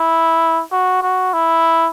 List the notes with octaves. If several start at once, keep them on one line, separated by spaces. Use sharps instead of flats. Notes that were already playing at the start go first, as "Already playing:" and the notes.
Already playing: E4
F#4
F#4
E4